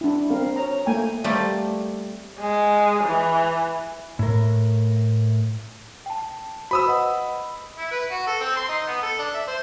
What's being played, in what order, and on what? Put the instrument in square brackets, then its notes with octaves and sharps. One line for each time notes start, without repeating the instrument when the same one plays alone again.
[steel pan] D4 E4
C4 A#4 F5
C#5 A#5
A3 A#3 G5 G#5 A#5
[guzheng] G3 A3 A#3 C4 G4
[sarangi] G#3
E3
[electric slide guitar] A2 A#4
[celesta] G5 A5
[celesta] F#4 C5 [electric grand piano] B5 D#6 E6
[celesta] B4 D#5 F#5
[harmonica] E4
B4
F#4
A4
C4
C6
D#4
B3
A4
D4
E5
C5